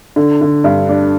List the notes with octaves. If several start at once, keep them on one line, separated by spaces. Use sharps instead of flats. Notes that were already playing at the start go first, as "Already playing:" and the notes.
D3
D3
G2
D4